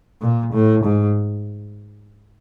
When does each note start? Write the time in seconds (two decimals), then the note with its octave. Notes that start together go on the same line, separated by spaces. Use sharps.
0.22 A#2
0.53 A2
0.84 G#2